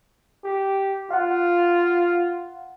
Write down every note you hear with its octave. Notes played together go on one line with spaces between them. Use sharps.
G4
F4 F5 F#5